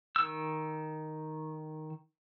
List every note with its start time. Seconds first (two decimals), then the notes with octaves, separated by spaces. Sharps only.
0.16 D#3 E6